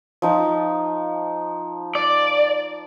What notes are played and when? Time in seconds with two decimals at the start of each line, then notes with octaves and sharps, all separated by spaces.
0.22 F3 D#4
1.95 D5